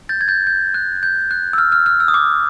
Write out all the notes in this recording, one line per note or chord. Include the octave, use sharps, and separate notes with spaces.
G6 A6
G#6
G6 A6
G6
F#6
G6
F#6
E6
F6
F6
F6
E6
D#6
D6